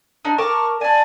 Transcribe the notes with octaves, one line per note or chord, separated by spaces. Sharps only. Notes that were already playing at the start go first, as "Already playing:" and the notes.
D4 D#4
A#4 A5 C#6 D6
D5 G#5 A5